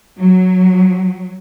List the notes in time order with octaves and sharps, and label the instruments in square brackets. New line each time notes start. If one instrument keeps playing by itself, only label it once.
[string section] F#3